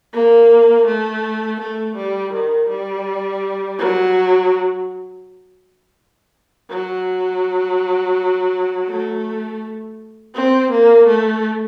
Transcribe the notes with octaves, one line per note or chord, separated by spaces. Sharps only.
A#3
A3
A3
G3
D#3
G3
F#3
F#3
A3
C4
A#3
A3